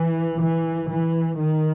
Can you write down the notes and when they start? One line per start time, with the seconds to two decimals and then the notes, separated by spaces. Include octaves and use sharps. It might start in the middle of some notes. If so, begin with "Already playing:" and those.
Already playing: E3
0.39 E3
0.88 E3
1.38 D#3